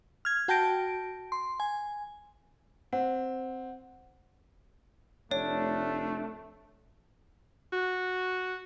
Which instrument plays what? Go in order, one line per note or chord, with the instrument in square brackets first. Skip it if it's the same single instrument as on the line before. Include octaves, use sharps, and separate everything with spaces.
[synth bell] F6 G#6
F#4 G5 A5 G6 A#6 D7
C6
G#5
[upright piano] C4 [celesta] F#5
[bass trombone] F1 [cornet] A3 [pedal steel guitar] D4 [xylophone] C#5
[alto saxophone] F#4